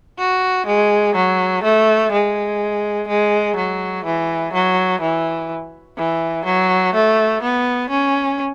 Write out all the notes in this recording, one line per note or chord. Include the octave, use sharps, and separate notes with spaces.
F#4
G#3
F#3
A3
G#3
G#3
F#3
E3
F#3
E3
E3
F#3
A3
B3
C#4